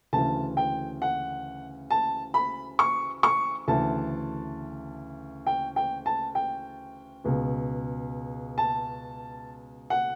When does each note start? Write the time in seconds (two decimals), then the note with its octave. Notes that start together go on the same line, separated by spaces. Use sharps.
0.13 D2 C#3 E3 A5
0.57 G5
1.02 F#5
1.91 A5
2.34 B5
2.79 C#6
3.23 C#6
3.68 D2 C#3 E3 A5
5.47 G5
5.76 G5
6.06 A5
6.35 G5
7.24 C#2 B2
8.58 A5
9.90 F#5